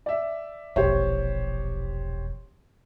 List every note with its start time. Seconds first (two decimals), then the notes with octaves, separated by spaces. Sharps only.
0.06 D5 E5
0.76 E1 A#1 G4 C5 C#5